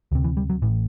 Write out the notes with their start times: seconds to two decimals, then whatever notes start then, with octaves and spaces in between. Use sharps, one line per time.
0.12 D2 C3
0.24 E3
0.37 G3
0.50 F#3
0.62 A1 A2 E3